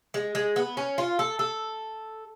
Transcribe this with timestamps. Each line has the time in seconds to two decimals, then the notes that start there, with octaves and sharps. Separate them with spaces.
0.14 G#3
0.35 G#3
0.56 B3
0.77 C#4
0.98 F4
1.19 A4
1.39 A4